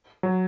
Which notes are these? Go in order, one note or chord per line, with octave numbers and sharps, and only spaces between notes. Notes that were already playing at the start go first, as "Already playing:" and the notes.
F#3